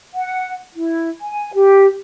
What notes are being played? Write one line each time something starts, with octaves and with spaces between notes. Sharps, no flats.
F#5
E4
G#5
G4